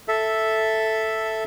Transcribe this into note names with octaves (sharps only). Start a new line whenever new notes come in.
A4 E5